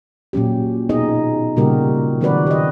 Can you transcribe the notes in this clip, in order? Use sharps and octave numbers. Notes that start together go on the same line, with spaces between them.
A#2 F#3 C#4 G4
B2 B3 D#4 G#4 D#5
A#2 C#3 G3 F#4 G4 A#4
D#3 F#3 C4 F#4 B4 D5
G4 D#5